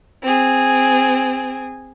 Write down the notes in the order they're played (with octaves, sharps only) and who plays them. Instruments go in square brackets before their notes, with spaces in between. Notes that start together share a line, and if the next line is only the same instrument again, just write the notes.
[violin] C4 G#4